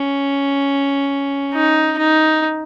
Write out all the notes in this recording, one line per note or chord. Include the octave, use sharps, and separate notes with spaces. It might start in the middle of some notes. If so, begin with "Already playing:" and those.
Already playing: C#4
D#4
D#4